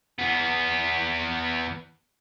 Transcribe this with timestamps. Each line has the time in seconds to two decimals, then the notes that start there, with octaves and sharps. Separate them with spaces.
0.19 E2 B3